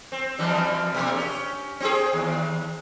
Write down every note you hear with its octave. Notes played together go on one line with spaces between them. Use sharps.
C4
E2 E3 G3
B2 A#3
C#4 G4
C4 G4 G#4
D#2